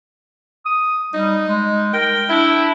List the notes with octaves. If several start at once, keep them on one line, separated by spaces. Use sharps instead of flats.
D#6
G3 D#4
G#3
A#4 G5
D4 E4